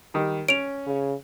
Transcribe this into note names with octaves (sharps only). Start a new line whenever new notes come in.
D#3 G3
C#4 D7 F7
C#3